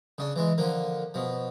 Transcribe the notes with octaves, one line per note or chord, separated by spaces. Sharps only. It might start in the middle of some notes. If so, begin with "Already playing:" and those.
C#3 D4
E3 G#3
D3 F3 A#3
B2 F3